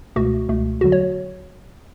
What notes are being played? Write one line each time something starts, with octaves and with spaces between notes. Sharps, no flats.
C#2 B2 A3 F#4
C#2 B2 A3
E2 D3 F#3 F#4
C#5